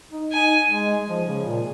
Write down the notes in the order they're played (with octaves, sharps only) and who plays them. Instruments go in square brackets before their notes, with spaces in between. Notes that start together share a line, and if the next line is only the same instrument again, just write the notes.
[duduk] D#4
[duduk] D#4 [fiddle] G#5
[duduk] G#3
F3
C#3
A#2